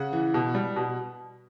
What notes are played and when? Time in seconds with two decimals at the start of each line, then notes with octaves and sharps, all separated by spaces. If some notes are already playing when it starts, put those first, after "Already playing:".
Already playing: C#3 F#5
0.13 E3
0.34 B2
0.55 G3
0.76 B2